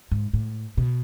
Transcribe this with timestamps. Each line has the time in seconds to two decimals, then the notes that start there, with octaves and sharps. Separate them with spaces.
0.12 G#2
0.33 A2
0.77 B2